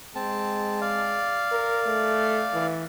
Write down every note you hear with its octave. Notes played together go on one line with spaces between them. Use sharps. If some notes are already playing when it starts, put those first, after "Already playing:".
G#3 C4 A5
D5 F5
A#4
A3
E3